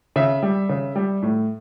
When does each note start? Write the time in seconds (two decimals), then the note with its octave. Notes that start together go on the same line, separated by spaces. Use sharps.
0.16 C#3 E5
0.43 G3
0.69 C#3
0.96 G3
1.22 A2